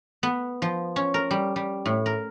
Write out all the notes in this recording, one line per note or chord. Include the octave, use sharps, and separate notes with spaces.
B3
F3
C#4
A#4
G3
G3
A2
A#4